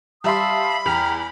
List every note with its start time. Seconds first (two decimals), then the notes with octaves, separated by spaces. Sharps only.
0.24 G3 E5 F5 A5 B5 C6 D#6
0.86 E2 G5 A#5 F6 B6 F7